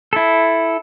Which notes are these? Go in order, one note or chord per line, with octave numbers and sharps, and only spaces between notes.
E4 A4